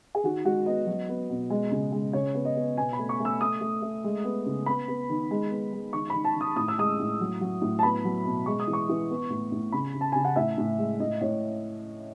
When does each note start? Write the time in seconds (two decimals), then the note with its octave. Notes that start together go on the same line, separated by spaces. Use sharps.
0.15 G#4
0.24 D#3 F#4
0.45 G#3 F#4
0.66 B3 D#5
0.87 F#3
1.09 B3
1.30 B2
1.50 G#3
1.71 C#3
1.92 G#3
2.13 C#3 C#5
2.35 B3
2.45 D#5
2.56 B3
2.77 B2 G#5
2.93 B5
2.99 A3
3.09 C#6
3.20 A3
3.25 E6
3.41 A3 D#6
3.61 A3
3.82 A3
4.04 G#3
4.24 B3
4.46 C#3
4.66 B3 B5
4.88 B3
5.10 D#3
5.31 G#3
5.51 B3
5.73 G#3
5.93 D#3 C#6
6.10 D#3 B5
6.25 A5
6.36 D#3 D#6
6.56 A2 D#6
6.68 E6
6.78 G#3 D#6
6.99 A2
7.21 F#3
7.41 F#3
7.62 A2
7.79 A5
7.83 B3 B5
8.05 F#3
8.25 B2
8.46 G#3 C#6
8.60 D#6
8.68 E3
8.73 C#6
8.89 E3
9.10 B3
9.30 A2
9.52 A2
9.72 C#3 B5
9.94 C#3
10.01 A5
10.12 C#3 G#5
10.25 F#5
10.36 A2 E5
10.58 A2
10.79 G#3
11.00 A2 D#5
11.21 A2 C#5